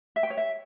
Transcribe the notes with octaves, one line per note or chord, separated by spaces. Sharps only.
E5
G5
C#5
E5